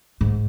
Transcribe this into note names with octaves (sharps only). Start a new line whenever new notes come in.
G#2